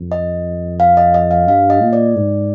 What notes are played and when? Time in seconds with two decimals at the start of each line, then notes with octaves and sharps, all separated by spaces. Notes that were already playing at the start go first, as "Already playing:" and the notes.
Already playing: F2
0.12 D#5
0.80 F5
0.97 D#5
1.14 D#5
1.31 F5
1.47 G2 F5
1.70 D#5
1.82 A#2
1.93 D5
2.16 G#2